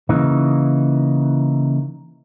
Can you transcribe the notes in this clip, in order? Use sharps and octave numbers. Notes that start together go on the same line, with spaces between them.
C#3 E3 A#3 D#4